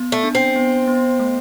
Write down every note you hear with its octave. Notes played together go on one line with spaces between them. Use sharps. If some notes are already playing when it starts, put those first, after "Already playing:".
Already playing: B3
A3
D4
C4
B3
B3
A3